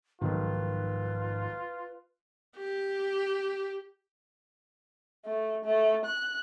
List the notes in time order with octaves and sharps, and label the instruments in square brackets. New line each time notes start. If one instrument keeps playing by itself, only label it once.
[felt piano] B1 D#3 [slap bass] G#2 B2 F3 [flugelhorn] F4 [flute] B4
[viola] G4
[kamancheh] A3
A3
F#6